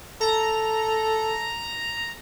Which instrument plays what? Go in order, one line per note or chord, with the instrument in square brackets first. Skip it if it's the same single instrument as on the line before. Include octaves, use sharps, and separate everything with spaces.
[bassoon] A4 [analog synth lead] A#5